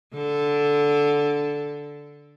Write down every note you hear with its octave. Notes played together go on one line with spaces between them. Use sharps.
D3 A4